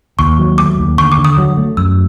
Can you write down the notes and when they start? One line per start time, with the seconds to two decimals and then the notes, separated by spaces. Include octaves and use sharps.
0.19 D#2 C#6
0.38 F#3
0.58 A3 D6
0.79 D#2
0.98 D3 C#6
1.12 D6
1.18 D3
1.25 D#6
1.38 F#3
1.57 A3
1.77 F#2 E6